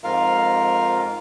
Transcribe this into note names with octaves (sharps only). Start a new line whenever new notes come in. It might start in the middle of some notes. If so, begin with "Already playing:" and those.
F2 G#2 F4 A#4 F5 F6